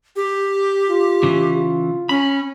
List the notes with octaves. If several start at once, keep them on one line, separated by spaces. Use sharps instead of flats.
G4
F4
C#3 E3
C#4 B5